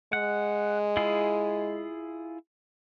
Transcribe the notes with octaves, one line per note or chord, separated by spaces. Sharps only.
G#3 F#5
E4 F4 G#4